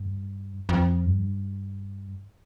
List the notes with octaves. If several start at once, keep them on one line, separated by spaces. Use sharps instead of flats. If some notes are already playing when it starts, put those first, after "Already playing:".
Already playing: G2
F2
G2